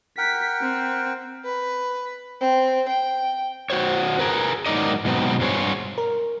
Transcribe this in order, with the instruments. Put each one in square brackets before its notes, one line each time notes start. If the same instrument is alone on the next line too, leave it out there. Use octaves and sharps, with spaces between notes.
[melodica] A#4 F#5 G5 [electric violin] B6
[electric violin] C4
[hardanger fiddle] B4
C4
G5
[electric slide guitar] F#4 C5 C#5
G#4 A#4 B4
G#2 F#3 D#4 A#4 D5 D#5
G#2 B2 F#3 B3 C4
G2 F#3 G#4 C5 C#5
[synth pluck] A#4